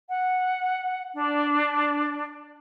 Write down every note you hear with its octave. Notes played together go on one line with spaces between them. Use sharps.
F#5
D4